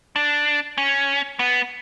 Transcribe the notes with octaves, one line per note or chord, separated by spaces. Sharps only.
D4
C#4
B3